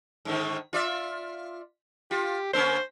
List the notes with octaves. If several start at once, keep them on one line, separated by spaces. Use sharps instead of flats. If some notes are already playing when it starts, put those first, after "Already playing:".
G#2 D3 D#3
F4 D5 E5
F4 G4
D3 A#3 C#4 C5